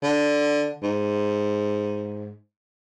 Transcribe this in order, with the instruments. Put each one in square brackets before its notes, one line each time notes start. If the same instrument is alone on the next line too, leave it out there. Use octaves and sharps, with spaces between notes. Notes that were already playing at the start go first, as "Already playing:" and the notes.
[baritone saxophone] D3
G#2